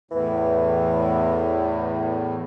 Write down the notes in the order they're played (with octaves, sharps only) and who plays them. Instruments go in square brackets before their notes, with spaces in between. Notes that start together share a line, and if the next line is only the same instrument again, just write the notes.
[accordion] E2 A2 [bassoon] E3